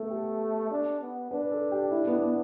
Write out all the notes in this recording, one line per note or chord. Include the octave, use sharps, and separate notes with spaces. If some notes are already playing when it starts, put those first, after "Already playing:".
Already playing: A3 B3 A4
G4
D4
B3
D4 B4
A4
G4
E4
B3
B3